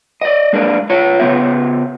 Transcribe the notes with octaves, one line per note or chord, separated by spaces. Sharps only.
D5 D#5
G#3 A#3 D4 A#4
F4 C#5
C#3 B3 E5